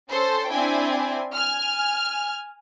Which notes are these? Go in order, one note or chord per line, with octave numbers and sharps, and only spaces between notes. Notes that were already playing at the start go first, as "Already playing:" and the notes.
C#4 A4 C5
C4 D4 E4 G5 G#5
G#5 F6